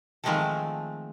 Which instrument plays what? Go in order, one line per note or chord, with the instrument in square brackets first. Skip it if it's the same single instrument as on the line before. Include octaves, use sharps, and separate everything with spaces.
[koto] D#3 F3 G#3 A3 C4 A4